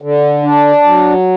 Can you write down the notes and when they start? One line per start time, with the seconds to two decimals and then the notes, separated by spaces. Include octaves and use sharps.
0.02 D3
0.43 D4
0.84 F#3